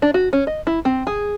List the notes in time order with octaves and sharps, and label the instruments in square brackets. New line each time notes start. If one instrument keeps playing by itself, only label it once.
[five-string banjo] D4
F#4
C#4
D#5
E4
C4
G#4